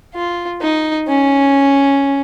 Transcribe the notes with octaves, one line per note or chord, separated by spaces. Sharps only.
F4
D#4
C#4